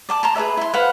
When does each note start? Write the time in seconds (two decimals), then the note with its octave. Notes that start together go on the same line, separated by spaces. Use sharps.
0.09 D5 A5 D6
0.23 A5 A#5 C6
0.35 G#4 B4 C#5 E5
0.57 E4 C6
0.74 B4 C5 F5 F#5